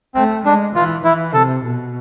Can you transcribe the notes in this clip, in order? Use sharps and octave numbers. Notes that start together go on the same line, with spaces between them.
A3 C4
G#3 D4
E3 F4
E3 E4
C3 A4
B2